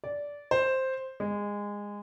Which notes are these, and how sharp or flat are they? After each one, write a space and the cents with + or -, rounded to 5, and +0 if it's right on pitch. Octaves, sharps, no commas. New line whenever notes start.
D5 -15
C5 +5
G#3 -20